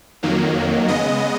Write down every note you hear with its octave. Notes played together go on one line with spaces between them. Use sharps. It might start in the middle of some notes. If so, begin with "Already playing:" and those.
F2 D#3 F#3 A#3
C#3 G#3 B3 D#5